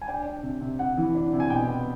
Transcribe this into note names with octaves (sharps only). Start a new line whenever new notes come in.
G#5
D4 G5
D4
C3
C3
C3 F#5
E3
D4
C3
G#5
B2 G5
B3